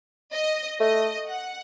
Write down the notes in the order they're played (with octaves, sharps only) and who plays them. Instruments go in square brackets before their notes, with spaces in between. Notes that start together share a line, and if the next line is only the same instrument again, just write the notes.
[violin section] D#5
[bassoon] A3 [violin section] D#5
[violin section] F#5